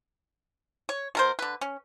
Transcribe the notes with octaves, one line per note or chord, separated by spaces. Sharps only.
C#5
B2 A#4 C5
D3 B4
C#4